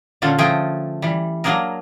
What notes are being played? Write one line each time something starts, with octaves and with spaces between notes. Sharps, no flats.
A#2 D3 C#4 F4 A4
F3 A3 G#4 G5
E3 G3
F#3 A#3 D4 G#4 A#4